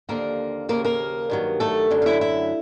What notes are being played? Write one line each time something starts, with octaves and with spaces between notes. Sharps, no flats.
D#2 D3 F3 A#3 A#4
D#2 C#3 F3 A#3 A#4
A#3 A#4
G2 D#3 F#3
A3 A4
F#2 D3 F#3
F5
E4 E5
E4 E5